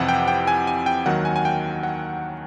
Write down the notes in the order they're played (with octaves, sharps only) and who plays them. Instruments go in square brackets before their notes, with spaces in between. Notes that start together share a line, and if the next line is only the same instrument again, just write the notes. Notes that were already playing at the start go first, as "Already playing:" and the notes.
Already playing: [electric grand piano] F2 C3 E3 F#5
G5
G5
G#5
G#5
G5
D#2 D#3 F#3 F#5
G#5
G#5
G5
F#5